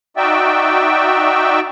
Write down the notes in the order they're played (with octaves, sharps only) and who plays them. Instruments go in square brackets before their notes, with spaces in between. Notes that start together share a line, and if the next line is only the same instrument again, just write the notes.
[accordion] D#4 F#4 D5 E5 G5